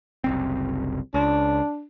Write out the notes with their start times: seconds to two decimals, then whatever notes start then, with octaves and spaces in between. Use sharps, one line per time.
0.24 F#1 C2 C4
1.14 C#2 D4